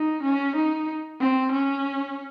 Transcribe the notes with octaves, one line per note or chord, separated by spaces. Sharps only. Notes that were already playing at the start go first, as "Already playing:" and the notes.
Already playing: D#4
C#4
D#4
C4
C#4